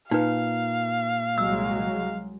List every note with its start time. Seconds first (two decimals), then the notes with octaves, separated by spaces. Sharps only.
0.11 A#2 D#4 B4 F5
1.38 C2 F#3 G#3 E6